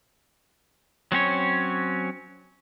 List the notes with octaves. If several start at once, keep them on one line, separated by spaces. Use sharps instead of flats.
F#3 C4 C#4 C#5